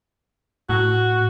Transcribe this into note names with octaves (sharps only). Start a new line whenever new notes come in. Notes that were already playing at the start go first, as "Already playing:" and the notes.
A2 F#4